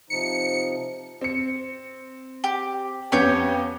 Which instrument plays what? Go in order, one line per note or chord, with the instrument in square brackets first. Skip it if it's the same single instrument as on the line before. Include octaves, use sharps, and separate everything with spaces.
[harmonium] C3 F3 D#4 [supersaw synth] C#7
[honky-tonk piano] C4 C#7
[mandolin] G4
[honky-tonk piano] F2 B3 C#4 [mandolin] G4 C#5 G6